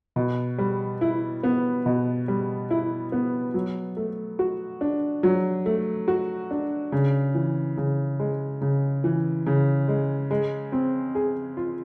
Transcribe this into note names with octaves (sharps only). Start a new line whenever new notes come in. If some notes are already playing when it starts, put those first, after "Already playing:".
B2
G3
E4
B3
B2
G3
E4
B3
F#3
A3
F#4
D4
F#3
A3
F#4
D4
C#3
E3
C#3
G#3
C#3
E3
C#3
G#3
G#3
C4
G#4
F4